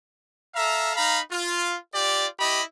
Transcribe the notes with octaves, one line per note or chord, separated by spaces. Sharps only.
A4 E5 F5 A#5
D#4 F5 A#5 B5
F4
F4 G4 D5
E4 G4 D#5 B5